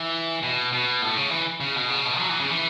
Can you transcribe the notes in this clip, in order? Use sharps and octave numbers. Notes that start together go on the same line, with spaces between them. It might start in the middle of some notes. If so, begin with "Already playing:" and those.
Already playing: E3
B2
B2
A2
C#3
E3
C#3
B2
C#3
B2
F#3
E3
C#3
E3